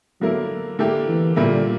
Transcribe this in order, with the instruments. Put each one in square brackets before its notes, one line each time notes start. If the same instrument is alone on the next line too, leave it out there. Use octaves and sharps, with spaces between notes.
[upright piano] D3 A#3 E4 A#4 [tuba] F#3
[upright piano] D3 A#3 E4 G4
[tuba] E3
[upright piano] A#2 G3 A#3 E4 [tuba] D3